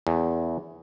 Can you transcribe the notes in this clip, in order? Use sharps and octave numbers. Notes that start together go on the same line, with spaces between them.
E2